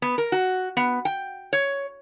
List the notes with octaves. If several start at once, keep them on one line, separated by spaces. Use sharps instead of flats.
B3
A#4
F#4
B3
G5
C#5